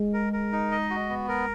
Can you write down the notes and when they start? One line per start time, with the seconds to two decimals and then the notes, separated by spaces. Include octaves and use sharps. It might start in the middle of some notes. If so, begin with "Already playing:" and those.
Already playing: G#3
0.14 A#4
0.33 A#4
0.52 D#4
0.71 D#5
0.90 F#4
1.09 B3
1.28 A#4